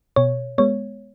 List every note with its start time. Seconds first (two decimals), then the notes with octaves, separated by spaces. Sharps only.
0.16 B2 C#5
0.58 G#3 B3 C#5